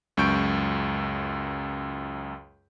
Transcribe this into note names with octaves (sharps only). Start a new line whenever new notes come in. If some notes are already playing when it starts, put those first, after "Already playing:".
C#2 F#2 C#6 G6 D7